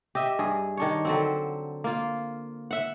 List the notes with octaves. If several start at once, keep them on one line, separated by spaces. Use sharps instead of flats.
G4 D#5 E5
G2 G#4
D#3 D4 C#5
D3 F#3 C4
A#3 F4
E5 F#5